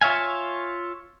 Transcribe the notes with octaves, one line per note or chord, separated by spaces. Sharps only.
F4 C#5 E5 F5 G#5